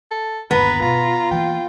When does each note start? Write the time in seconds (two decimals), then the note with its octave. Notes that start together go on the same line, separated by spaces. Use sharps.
0.11 A4
0.51 G1 D#2 B3 B4 A#5
0.82 B2 F4 A#5
1.31 E3 A#3 G5